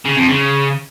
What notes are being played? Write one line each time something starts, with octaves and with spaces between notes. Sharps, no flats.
C#3
F2
C#3